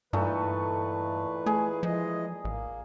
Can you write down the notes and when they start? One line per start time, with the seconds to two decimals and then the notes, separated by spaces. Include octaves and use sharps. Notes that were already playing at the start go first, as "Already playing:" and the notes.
0.13 G2 A#2 E3 A3 D#4 B4
1.46 A3 G#4
1.83 E3 F3 G#3 D#5
2.45 A1 A#3